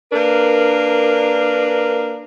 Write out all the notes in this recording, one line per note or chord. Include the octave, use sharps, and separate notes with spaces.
A#3 D4 A#4 B4